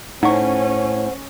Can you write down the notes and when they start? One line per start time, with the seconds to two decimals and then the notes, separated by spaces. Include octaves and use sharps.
0.23 A2 C#4 D#4 C5 C#5 F#5 C#6